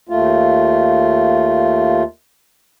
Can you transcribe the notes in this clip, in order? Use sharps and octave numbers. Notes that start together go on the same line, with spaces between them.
D#2 A3 F4